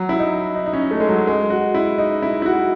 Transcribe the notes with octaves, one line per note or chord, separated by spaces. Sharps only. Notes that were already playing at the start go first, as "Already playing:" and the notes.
Already playing: F#3
E4
D#4
D#4
D#4
C#4
A3
G#3
F#3
G#3
F#4
E4
D#4
E4
E4
F#4